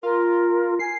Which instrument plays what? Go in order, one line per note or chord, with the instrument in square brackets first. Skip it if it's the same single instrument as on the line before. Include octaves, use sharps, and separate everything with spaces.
[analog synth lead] F4 [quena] A#4
[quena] G#5 [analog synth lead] C7